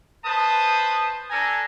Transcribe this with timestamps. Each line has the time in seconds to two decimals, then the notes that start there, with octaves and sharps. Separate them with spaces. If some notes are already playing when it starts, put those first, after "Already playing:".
0.25 B4 C5 A5 D#6
1.30 D4 A4 G#5 A#5